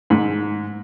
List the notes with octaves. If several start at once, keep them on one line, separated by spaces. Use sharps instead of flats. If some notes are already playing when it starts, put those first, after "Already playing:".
G#2